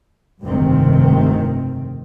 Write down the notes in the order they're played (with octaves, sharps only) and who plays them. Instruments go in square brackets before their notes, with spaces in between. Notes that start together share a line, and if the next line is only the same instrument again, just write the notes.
[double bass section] F1 C#2 G2 C3 D#3 C4